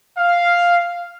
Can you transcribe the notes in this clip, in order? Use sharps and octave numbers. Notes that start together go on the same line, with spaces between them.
F5